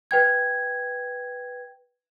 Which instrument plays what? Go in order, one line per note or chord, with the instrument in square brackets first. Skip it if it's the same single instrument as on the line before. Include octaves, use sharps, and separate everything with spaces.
[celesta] B4 G5 G#6